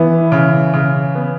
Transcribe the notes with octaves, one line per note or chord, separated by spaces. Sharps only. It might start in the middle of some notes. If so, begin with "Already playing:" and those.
Already playing: E3 B3
C#3
C#3
B3